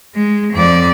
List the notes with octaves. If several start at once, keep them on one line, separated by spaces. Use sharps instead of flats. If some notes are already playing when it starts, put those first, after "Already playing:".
G#3
F2 D5